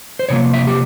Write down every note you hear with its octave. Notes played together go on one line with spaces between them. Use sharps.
C5
C3 F3 A#3 C#5
E5
G4